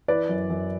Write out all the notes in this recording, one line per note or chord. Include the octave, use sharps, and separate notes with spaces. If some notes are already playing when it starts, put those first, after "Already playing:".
E3 B4 D5
F#2
F#2